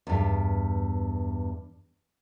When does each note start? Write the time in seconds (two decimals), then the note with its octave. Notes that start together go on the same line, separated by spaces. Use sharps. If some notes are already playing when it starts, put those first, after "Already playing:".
0.07 E2 G2